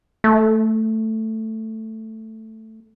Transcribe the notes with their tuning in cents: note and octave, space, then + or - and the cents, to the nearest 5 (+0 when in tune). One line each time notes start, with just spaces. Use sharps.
A3 +5